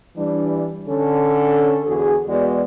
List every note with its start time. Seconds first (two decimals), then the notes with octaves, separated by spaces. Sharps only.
0.17 E3 G3 D4
0.88 D3 C#4 A4
1.87 E2 D3 F#4 G#4
2.28 E2 G#3 B3 F#4 D5